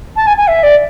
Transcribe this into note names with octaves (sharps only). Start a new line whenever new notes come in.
A5
G#5
G#5
E5
D5